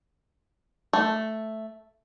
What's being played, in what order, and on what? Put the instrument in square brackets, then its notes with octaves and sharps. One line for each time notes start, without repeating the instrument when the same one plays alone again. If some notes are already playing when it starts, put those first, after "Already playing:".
[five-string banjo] A3